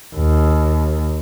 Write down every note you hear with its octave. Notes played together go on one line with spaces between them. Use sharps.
D#2